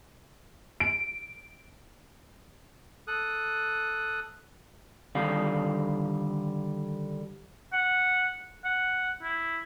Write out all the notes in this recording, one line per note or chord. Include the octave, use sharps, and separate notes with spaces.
D7
A4 D#6 F#6
D3 D#3 G3 F5
F#5
F#5
E4